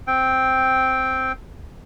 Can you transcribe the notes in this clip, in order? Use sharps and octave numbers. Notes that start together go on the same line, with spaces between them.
C4 G5